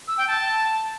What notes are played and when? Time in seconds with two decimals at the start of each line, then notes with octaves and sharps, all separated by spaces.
0.08 E6
0.18 G5
0.27 A5